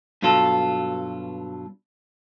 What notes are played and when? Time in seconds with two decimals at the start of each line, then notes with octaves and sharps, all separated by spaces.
0.22 G2 B2 F#3 F4 A4